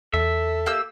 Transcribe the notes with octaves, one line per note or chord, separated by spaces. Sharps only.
E2 A4 E5
A#3 G4 E6